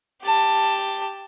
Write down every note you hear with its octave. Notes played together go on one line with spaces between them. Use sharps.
G4 A5